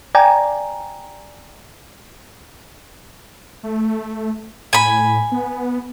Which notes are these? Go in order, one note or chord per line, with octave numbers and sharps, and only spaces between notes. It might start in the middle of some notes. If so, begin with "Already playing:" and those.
D5 G5 G#5 A#5
A3
A2 G#5 B5
B3